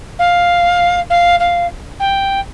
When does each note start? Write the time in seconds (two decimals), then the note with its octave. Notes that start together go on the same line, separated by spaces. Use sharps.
0.19 F5
1.10 F5
1.40 F5
2.00 G5